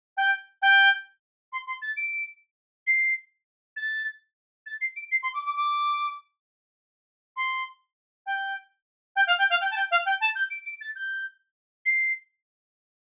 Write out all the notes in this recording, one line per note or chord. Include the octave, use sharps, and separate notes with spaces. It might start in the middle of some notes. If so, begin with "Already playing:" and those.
G5
G5
C6
C6
A6
D7
C7
A6
A6
C7
D7
C7
C6
D6
D6
D6
C6
G5
G5
F5
G5
F5
G5
A5
G5
F5
G5
A5
G6
D7
D7
A6
G6
C7